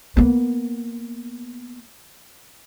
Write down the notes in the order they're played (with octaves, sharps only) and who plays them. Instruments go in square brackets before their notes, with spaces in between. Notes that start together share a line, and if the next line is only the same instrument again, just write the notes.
[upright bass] A#3 B3